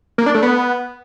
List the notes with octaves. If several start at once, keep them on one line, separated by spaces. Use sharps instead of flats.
A#3
D4
A3
B3